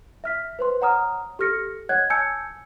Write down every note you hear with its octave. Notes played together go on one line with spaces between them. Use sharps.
E5 F6 B6
B4 C5 C6
C#5 F#5 A#5 D#6 F6
G4 A4 F6 A#6 C#7
C#5 D#5 F#5 F#6 G#6
G#5 A5 E6 G6 G#6 C#7